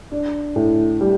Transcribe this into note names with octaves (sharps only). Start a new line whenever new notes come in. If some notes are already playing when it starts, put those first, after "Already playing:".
D4
A2
G3